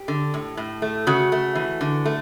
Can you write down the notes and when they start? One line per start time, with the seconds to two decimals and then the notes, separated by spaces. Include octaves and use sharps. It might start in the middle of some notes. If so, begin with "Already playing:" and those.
Already playing: G4
0.08 D3
0.34 A2
0.57 A2
0.82 A3
1.07 C#3 F#4
1.32 A3
1.55 E3
1.81 D3
2.05 A3